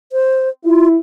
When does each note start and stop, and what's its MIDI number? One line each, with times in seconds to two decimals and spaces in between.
0.12 0.49 72
0.65 0.97 64
0.65 0.87 65